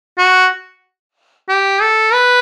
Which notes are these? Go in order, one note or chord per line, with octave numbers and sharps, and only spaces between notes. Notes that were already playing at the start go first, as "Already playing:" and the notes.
F#4
G4
A4
B4